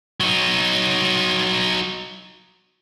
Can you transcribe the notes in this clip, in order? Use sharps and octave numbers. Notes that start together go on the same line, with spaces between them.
F#3 D#4